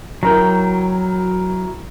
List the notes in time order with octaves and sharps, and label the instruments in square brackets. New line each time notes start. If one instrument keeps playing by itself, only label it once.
[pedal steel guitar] F#3 G5 [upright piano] E4 A#4 A#5